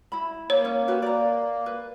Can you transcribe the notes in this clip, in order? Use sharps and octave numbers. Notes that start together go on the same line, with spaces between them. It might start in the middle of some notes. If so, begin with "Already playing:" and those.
E4 B5
A#3 C#5
C#4
F#4 G4 B4
D5 A#5
B4